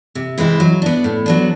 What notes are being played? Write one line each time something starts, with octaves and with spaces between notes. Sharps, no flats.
C3
E3 G#3 C4 E4
F#3
B3 D4
A2
F#3 B3 D4